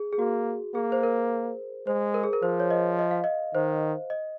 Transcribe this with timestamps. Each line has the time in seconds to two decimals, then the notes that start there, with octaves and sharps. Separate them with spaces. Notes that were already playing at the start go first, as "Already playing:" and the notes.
Already playing: G#4
0.13 G#4
0.19 A#3 F#4
0.75 A#3 G#4
0.92 C5
1.03 A#4
1.87 G#3 C5
2.14 A#4
2.23 G#4
2.33 A#4
2.43 F3 C5
2.60 C#5
2.71 D#5
2.99 D#5
3.11 F5
3.24 D#5
3.54 D#3 C5
4.10 D#5